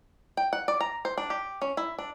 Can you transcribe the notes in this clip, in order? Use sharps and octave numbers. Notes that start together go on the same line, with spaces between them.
G5
F#5
D5
A#5
C5
D4
G4
C#4
E4
D4